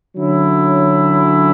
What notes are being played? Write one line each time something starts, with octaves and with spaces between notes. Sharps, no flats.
D3 F#3 C#4 E4